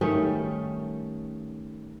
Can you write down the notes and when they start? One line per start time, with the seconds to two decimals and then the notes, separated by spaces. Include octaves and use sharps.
0.01 D#3 G3 A3 C#4